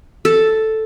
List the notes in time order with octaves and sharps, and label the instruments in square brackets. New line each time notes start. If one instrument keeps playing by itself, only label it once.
[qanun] A4